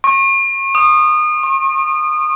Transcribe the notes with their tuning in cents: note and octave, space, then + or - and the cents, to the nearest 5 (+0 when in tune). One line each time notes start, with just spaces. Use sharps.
C#6 -35
D#6 -25
C#6 -45